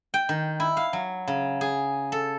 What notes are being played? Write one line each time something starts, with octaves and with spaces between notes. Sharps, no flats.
G5
D#3
E4
F5
F#3
C#3
G#4
A4